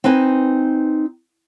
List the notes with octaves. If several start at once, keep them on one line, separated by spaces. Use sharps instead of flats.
C4 D#4 B4 G#5